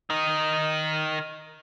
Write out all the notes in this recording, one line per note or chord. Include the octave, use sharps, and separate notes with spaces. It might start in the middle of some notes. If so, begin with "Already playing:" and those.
D#3 D#4